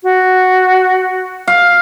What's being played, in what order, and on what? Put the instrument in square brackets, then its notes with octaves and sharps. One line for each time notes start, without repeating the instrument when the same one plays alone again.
[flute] F#4
[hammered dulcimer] F5